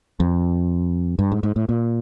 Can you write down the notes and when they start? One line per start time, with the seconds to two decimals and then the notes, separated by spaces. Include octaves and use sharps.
0.20 F2
1.19 G2
1.32 G#2
1.43 G#2
1.56 A2
1.69 A#2